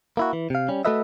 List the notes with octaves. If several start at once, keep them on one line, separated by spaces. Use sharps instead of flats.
A#3 E4 F#4
E3
C3 F5
G3 C#4
A3 F#4 A4 B4 D#5 E5